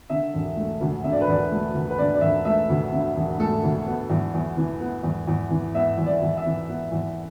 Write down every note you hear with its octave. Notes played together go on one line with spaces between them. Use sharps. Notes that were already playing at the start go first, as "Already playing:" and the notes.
D3 E5
E1
A3
D2
D3 E5
D5
B4
E1 D5
A3
D2
B4
D3 D5
D5
E1 E5
A3 E5
D2
D3
E1
A3 A4
D2
B3
E2
E2
E3
B3
E2
E2
E3
B3 E5
E2
D5
E2
E5
E3
B3
E2